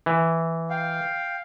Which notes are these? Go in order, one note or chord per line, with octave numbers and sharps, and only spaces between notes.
E3
F5 G5